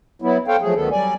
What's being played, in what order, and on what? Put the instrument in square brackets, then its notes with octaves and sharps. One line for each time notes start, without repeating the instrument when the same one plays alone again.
[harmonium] F#3 B3 E4
A4 C5 C#5 F5 G5
F3 F#3 A3 G#4
D2 D#3 F#3 A3 B3 A4
F#3 G3 D5 G#5